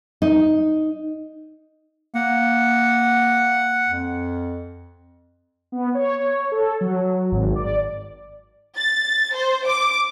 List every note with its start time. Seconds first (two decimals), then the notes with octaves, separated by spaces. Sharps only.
0.22 D#4
2.15 A#3 F#5
3.88 F2
5.72 B3
5.95 C#5
6.52 A4
6.81 F#3
7.31 G#1
7.55 D5
8.77 A6
9.34 C5
9.66 D6